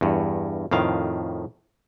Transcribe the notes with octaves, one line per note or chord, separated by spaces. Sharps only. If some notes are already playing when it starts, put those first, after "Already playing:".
E2 G2
F2 A2 D#3 F5